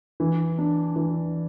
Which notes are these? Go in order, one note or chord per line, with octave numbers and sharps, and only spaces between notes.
E3
D4
E3